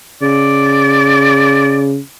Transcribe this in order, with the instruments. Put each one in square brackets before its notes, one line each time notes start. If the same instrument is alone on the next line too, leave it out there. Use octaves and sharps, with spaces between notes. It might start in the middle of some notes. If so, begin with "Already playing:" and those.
[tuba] C#3 [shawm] D5